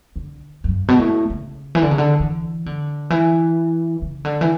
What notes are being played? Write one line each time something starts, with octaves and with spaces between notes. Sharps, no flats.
D3
F#2
G2
B2
A2
C#3
E3
D3
C#3
D3
E3
D3
E3
C#3
D3
E3